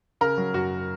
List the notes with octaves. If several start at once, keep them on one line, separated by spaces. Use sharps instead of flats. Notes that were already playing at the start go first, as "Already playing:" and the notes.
C#3 A#4
F#3
F#2 F#4